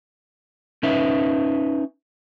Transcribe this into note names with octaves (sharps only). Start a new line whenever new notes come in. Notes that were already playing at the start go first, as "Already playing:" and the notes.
C#4 D#4 B4 E5